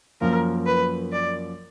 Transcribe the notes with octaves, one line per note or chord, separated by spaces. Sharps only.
F#2 F3 A#3 A#4
B4
D5